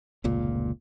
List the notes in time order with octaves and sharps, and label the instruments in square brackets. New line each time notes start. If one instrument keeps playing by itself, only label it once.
[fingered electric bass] F1 C#2 A#2